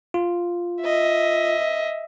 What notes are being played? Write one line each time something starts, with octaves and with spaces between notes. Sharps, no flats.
F4
D#5 E5